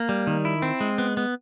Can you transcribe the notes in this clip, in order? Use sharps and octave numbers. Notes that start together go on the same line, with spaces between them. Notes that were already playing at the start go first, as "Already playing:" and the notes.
Already playing: A#3
G3
D#3
E4
C4
G#3
B3
B3